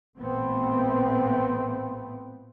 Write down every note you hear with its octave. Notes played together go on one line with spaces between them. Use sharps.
A1 A#2 A3 B3 C4